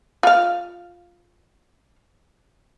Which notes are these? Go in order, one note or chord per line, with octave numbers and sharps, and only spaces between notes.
F4 F5